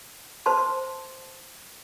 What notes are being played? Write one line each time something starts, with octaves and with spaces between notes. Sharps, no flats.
B4 C5 A5 C6